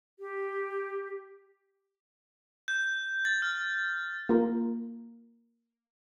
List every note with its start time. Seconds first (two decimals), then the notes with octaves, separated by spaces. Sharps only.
0.19 G4
2.68 G6
3.25 A6
3.42 F6
4.29 A#3 F4 A#4